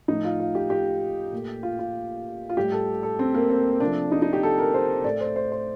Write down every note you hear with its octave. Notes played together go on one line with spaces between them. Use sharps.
A2 F3 A3 D#4
F4
F4
G4
G4
A#2 A3
F4
F4
F4
A2 G3 G4
A4
A4
C4
A#3
C4
C3 F3 A3 D4
D#4
D#4
G4
A4
A#4
C5
A2 A3 D5
C5
C5
C5